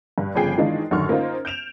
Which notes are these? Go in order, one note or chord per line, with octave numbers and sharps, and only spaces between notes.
G2
G1 C#3 F3 G#4 G5 C7
D#3 E3 G#3 D4 D#4 F4
A1 F#2 D3 D#3 C#6 F6
A#3 C#4 D#4 F4 C5
G6 D7 E7 F7